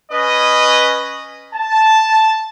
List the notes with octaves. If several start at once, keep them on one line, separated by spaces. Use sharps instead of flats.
C#4 B4 D#5
A5